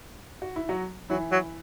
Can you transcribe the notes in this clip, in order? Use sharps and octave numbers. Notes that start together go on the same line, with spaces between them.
F#4
E4
F#3 F#4
E3 F#3 E4
F#3